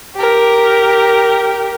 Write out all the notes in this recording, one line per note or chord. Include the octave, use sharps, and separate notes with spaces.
G4 A#4